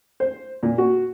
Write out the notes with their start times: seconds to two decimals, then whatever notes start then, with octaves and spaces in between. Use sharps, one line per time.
0.20 C5
0.63 A#2
0.78 F#4